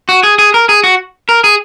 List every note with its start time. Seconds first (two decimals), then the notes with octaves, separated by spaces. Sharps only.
0.09 F#4
0.23 G#4
0.39 G#4
0.54 A#4
0.69 G#4
0.84 F#4
1.29 A#4
1.44 G#4